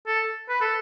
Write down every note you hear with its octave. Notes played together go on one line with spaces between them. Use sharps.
A4
B4
A4